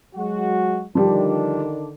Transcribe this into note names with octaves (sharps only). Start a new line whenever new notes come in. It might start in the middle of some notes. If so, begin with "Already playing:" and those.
F#3 G#3 F#4
D3 D#3 F3 G3 D4